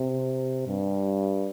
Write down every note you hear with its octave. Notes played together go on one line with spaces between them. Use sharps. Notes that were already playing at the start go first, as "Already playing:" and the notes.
Already playing: C3
G2